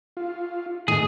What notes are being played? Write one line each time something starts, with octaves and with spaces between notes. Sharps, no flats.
F4
A2 D#3 G#4